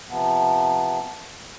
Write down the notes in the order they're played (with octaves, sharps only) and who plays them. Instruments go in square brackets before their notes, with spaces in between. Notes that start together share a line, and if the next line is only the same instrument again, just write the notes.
[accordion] C3 F3 B3